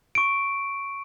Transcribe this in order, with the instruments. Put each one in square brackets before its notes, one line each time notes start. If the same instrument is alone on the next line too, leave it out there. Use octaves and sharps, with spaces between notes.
[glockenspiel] C#6 D7